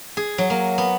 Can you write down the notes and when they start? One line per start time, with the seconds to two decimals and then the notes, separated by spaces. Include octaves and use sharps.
0.17 G#4
0.38 F#3
0.50 A#3
0.78 B3